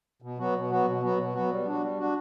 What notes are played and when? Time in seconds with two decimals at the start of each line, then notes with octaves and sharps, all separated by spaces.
0.22 B2
0.38 F#3 B3 F#4
0.55 B2
0.70 F#3 B3 F#4
0.86 B2
1.02 F#3 B3 F#4
1.18 B2
1.34 F#3 B3 F#4
1.50 G3
1.66 D4 F#4
1.82 G3
1.98 D4 F#4